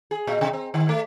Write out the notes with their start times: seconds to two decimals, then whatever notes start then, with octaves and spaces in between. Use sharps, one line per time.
0.11 G#4
0.27 A#2
0.41 C3
0.53 C4
0.74 D#3
0.89 A3